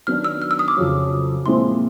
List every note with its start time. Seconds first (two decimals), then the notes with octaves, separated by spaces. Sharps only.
0.07 D#3 F#3 B3 D4 F#4 F6
0.24 E6
0.42 F6
0.51 E6
0.59 D#6
0.68 D6
0.77 F2 C#3 F#3
1.46 A#2 F3 G#3 C4 E4 C6